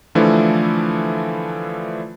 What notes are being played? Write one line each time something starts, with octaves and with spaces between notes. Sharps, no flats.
D3 E3 F3 A3 E4